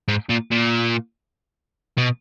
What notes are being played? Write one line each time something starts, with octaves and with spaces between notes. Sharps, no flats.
G#2
A#2
A#2
B2